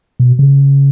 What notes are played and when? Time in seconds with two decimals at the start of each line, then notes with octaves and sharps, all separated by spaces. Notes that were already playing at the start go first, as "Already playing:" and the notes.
0.20 B2
0.39 C#3